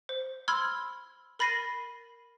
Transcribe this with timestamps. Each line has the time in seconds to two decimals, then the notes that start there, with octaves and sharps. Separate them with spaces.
0.09 C5
0.48 B5 C6 E6 F6 G#6
1.39 A#4 B5 A6 A#6 C7 D#7